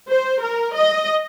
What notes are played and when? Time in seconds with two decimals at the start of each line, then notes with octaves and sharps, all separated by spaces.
0.09 C5
0.42 A#4
0.75 D#5